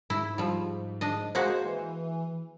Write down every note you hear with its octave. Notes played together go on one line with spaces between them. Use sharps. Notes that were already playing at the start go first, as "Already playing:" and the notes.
G#2 E4
F3 G3
D4 D#5
G#3 A#3 F#4 C5
E3